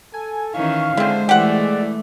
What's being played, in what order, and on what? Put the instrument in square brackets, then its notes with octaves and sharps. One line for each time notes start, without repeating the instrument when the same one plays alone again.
[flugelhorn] A4 [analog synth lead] G#5
[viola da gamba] D#3 E3 C#4 [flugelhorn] F5 [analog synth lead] C#6
[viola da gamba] D3 D4 C5 [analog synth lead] G#3 [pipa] C4 E4
[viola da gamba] E3 A3 [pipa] G4 F#5 [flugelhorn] D5